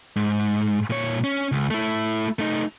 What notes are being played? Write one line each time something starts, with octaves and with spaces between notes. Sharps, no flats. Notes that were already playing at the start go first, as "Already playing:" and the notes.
G#2
A#2 C#5
C#4
C#2
A3 E4
A3 D#4